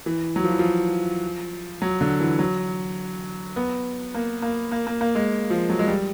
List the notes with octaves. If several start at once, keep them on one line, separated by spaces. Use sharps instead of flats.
E3
F#3
F3
E3
F3
F#3
D3
E3
F#3
B3
A#3
A#3
A#3
A#3
A#3
G#3
F3
F#3
G#3
G3